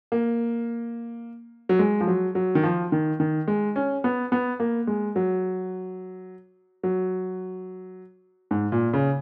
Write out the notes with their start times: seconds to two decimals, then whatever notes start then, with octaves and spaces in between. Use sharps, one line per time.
0.12 A#3
1.69 F#3
1.79 G#3
2.01 F3
2.07 F#3
2.35 F#3
2.55 D#3
2.63 F3
2.92 D#3
3.20 D#3
3.48 G#3
3.76 C#4
4.04 B3
4.32 B3
4.60 A#3
4.87 G#3
5.16 F#3
6.83 F#3
8.51 G#2
8.72 A#2
8.93 C#3